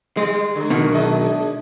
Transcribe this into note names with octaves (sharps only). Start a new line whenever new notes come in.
G3 G#3
D3
B1 B2 D#3
G#3 D4 D#5